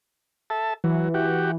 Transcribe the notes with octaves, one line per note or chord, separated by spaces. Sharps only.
A4 E5 A5
E3 F#3
F#4 G4